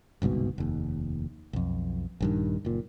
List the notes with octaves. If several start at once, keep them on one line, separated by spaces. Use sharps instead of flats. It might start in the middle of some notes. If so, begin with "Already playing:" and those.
G1 C2 G#2 B2
F1 D#2
B1 F2
A#1 G2 D#3
F#1 A#2